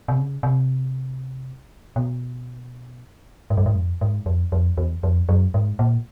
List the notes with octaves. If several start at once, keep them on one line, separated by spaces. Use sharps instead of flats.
C3
C#3
C3
B2
G#2
G2
G#2
F2
G#2
F2
F2
E2
F2
F#2
G#2
A#2